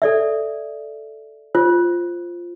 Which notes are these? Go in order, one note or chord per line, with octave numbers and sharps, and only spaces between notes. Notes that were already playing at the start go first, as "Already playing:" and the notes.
A4 D5 E5
F4 C5